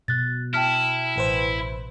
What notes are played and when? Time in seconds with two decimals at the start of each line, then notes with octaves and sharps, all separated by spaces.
0.08 B2 F#6 A6
0.54 E4 G5 A5 F6
1.16 A1 B4 C5